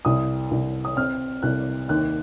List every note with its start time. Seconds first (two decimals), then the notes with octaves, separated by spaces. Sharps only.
0.05 C2 D#6
0.51 C2
0.85 D#6
0.97 C4 F6
1.43 C2 F#6
1.89 D#2 F#6